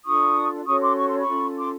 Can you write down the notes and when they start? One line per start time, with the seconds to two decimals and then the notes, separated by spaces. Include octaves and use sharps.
0.04 D4 F4 A4 C#6 D#6
0.65 C#4 F#4 A4 C#5 C#6 D#6
0.80 C6 D6
0.96 C#6
1.07 C6
1.18 B5 C#6
1.26 C#4 F4 A4
1.57 C6 D6